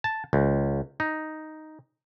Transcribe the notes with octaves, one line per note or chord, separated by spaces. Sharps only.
A5
C#2
D#4